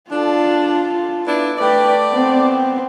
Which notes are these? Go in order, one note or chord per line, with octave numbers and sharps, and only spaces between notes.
D4 F4 A4
B3 D4 E4
A3 B4 D5 G5
B3 C4